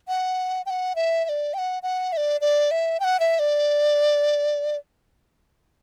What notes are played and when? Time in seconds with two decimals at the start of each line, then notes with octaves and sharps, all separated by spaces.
0.08 F#5
0.66 G5
0.70 F#5
0.96 E5
1.25 E5
1.29 D5
1.54 G5
1.58 F#5
1.83 F#5
2.13 E5
2.17 D5
2.41 D5
2.71 E5
3.00 G5
3.04 F#5
3.20 E5
3.39 D5